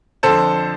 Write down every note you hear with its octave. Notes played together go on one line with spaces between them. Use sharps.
F2 D3 F3 A4 C5